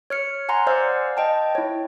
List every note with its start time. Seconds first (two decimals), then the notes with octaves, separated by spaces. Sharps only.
0.10 C#5 F6 C#7
0.49 F#5 G#5 A#5 C6
0.67 C5 D5 F5 F#5 E6 F6
1.17 D#5 G5 A5
1.55 E4 C#5